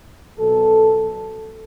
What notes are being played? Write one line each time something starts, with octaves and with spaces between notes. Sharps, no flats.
B2 F#3 A4